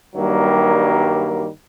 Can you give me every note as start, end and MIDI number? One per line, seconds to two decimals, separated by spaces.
0.15 1.48 43
0.15 1.48 51
0.15 1.48 54
0.15 1.48 55
0.15 1.48 58